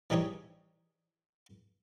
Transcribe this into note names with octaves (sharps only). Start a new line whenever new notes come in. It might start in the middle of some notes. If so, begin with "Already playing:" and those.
E3 G3 D#4 G#4 C#5